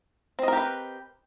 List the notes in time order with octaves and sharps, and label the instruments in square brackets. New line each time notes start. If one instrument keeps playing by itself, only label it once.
[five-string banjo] C4
D#5
A#4
G4
B4